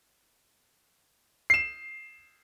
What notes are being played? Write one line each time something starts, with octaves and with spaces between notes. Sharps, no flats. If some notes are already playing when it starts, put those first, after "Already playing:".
C7 E7